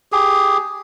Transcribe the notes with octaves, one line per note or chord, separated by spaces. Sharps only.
G4 G#4